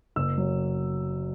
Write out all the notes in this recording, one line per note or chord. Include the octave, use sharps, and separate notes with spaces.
F#1 E6
F#3